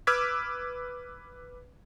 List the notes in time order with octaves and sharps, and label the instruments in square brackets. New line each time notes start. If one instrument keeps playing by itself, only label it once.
[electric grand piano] B4 D6 E6 F6 G#6 B6